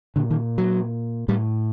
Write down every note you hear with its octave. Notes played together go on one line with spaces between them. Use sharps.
A#2 D3
D#3
F#3
A2 G3